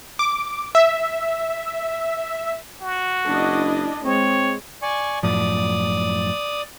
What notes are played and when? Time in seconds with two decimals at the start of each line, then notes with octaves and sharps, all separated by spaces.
0.19 D6
0.75 E5
2.82 F#4
3.28 F#1 D4 E4 D#5
4.05 G#3 C4 C#5
4.82 D5 G#5 C#6
5.23 F#2 A2 F3 D5 D#6